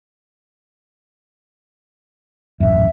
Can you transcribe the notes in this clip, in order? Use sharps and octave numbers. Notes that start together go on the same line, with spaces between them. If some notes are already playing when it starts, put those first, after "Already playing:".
D#1 A1 F#2 E5